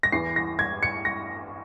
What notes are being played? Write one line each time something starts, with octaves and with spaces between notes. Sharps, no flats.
A#6
E2 E3 C7
A#6
G#6
C#7
A#6